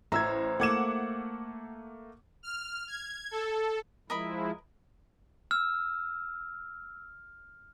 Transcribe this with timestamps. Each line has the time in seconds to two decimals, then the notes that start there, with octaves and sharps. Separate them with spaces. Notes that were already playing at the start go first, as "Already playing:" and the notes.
0.12 A1 C5 E5 A#5 E6 G#6
0.60 A3 A#3 F#5 D6 G#6 E7
2.43 F6
2.88 G#6
3.31 A4
4.10 F3 G#3 E4 A#4 D#5 B5
5.51 E6 F6